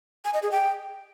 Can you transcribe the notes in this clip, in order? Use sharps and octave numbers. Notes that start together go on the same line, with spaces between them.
G#5
D#5
G#4
G5